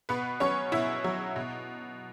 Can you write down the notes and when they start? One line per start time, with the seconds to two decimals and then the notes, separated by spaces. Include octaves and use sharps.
0.09 B2 B3 B4
0.40 F#3 C#4 C#5
0.72 B2 E4 E5
1.04 F#3
1.36 B2